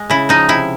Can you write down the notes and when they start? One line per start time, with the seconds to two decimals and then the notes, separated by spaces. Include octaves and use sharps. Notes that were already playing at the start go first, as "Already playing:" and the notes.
Already playing: G#3
0.10 C#3 E4
0.29 F3 D#4
0.49 C3 E4